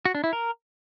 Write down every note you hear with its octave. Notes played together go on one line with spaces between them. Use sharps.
F#4
D4
E4
A#4